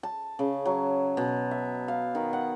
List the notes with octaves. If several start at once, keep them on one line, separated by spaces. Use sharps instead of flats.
A5
C#3
F#3
B2
E5
F5
D#3
F#5